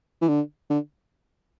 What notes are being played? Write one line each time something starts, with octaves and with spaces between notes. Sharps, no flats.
E3
D3
D3